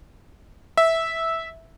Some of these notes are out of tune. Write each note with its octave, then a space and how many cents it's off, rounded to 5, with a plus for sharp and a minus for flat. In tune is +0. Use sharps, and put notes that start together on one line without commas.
E5 -10